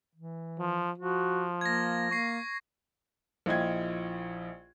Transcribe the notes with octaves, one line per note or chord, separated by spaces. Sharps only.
E3
F3
F3 F#4
A#3 G#6 A#6
A#3 C#6 C7
A#1 E4 F4 D#5 G5 G#6